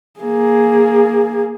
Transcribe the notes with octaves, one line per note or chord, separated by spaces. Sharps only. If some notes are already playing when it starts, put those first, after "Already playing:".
A#3 G#4